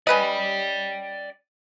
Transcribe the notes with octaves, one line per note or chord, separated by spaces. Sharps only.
C#4 B4 D5 D#5 G5